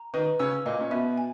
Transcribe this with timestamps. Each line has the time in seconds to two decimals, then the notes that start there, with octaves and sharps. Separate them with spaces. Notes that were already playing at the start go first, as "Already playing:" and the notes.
Already playing: A#5
0.14 D#3 D#4 B4
0.39 C#3 C#4 E6
0.65 A#2 A#3 D#5
0.81 C#4
0.91 B2 B3 E5
1.18 G#5